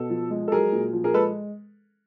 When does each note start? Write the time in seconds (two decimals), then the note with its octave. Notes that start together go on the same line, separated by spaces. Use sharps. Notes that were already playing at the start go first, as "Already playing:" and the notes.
Already playing: B2 A4
0.10 F3
0.30 G#3
0.48 A4
0.52 F#3 G#4 A#4
0.72 A#2
0.93 F3
1.04 G#4 A#4
1.14 G#3 A4 B4